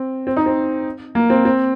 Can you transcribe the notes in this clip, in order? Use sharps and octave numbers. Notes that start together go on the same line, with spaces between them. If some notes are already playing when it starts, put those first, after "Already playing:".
Already playing: C4
C4
D#4
C4
A#3
C4
C4